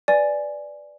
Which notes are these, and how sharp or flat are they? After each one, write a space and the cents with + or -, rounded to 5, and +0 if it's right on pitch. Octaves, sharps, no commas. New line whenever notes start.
B4 +10 D5 +0 G#5 +0